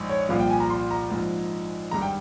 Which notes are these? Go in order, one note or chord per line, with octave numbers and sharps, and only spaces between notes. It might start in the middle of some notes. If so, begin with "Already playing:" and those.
Already playing: A#1 G#2
C#5
C2 A#2 F3 F5
G5
G#5
A#5
C6
A#5
A#1 G#2 F3
G#1 G2 G3 A#5
G5